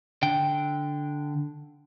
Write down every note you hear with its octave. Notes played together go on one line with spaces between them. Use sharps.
D3 G5